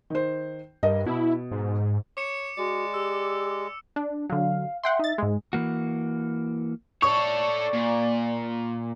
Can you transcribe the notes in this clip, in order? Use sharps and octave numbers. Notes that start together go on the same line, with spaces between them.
D#3 C5
G2 A#4 D#5
B2 E4
G#2
C#5 D6 C#7 E7
G#3 F#4 D5
G4 E6
D4
D3 F#3 F5
E5 F#5 G5 C6
D#4 A6
G#2 G#3
E3 A#3 F#4
A4 C#5 D5 C#6
A#2